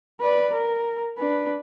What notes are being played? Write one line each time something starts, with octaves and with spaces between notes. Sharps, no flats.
B4 D5
A#4
D4 B4